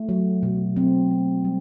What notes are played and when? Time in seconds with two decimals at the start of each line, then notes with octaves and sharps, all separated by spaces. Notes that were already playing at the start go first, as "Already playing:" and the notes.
Already playing: A3
0.09 F#3
0.43 B2
0.76 F#3 C4
1.11 A3
1.44 G3